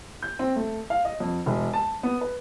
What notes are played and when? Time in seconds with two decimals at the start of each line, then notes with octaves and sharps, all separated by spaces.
0.22 G6
0.39 C4
0.56 A3
0.90 F5
1.05 D#5
1.20 F2
1.46 E1
1.73 A5
2.03 B3
2.21 B4